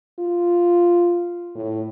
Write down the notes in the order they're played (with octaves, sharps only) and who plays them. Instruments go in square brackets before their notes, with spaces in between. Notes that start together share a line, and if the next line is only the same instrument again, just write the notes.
[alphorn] F4
A2